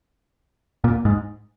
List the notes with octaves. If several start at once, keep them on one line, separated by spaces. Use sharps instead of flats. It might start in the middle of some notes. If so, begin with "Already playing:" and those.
A#2
G#2